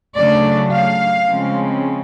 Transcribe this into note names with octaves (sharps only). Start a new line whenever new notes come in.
C#3 F#3 A3 D4 D5
F5
C#3 F3 G#3 C4